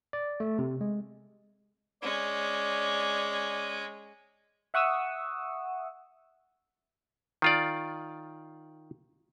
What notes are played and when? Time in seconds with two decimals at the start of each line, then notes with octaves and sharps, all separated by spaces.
0.13 D5
0.40 A3
0.59 C3
0.81 G#3
2.02 G#3 C#4 D5
4.74 E5 F#5 C#6 D#6 E6
7.42 D#3 F4 D5